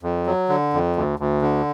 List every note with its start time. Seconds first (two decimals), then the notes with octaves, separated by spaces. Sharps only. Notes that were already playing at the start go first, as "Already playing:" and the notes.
0.03 F2
0.27 F#3
0.49 D3
0.73 F2
0.96 D2
1.19 D2
1.42 D3